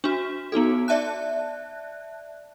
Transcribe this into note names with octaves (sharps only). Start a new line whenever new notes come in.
D4 F#4
B3 D#4 F#4 A4
D5 E5 A5 F#6